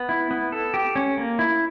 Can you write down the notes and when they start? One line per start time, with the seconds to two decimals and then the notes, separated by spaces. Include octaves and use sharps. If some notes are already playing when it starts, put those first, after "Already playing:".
Already playing: B3
0.09 E4
0.31 B3
0.52 A4
0.74 G4
0.96 C#4
1.18 A#3
1.39 E4